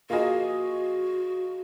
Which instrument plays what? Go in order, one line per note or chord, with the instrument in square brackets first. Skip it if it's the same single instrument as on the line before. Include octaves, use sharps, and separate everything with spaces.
[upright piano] A#3 F4 G#4 D#5 [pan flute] F#4